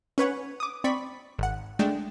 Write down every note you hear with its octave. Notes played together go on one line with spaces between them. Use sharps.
C#4 B4 C#5 F#5
D6 D#6
C4 D5 B5 C#6 B6
G#1 F#5
G#3 A3 D4 G5